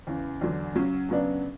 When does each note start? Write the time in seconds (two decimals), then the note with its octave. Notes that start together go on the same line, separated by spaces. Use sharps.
0.07 E2 C#3 E3
0.41 E2 D3 F#3
0.75 C#3 F#3 C#4
1.09 F#2 C#3 F#3 B3 D4